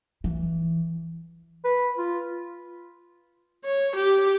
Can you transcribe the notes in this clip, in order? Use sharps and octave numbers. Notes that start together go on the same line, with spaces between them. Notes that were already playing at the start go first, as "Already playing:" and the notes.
E3
B4
F4
C#5
G4